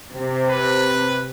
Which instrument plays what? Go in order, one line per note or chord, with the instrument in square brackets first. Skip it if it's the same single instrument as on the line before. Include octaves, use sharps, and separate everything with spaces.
[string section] C3
[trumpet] B4